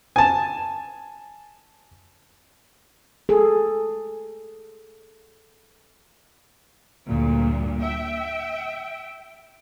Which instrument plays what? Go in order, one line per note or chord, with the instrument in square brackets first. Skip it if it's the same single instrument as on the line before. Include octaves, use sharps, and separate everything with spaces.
[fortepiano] G#5 A5
[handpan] G#4 A4
[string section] D2 G2 A#2
E5 G5